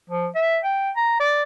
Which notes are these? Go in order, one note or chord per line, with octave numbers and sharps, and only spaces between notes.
F3
E5
G5
A#5
D5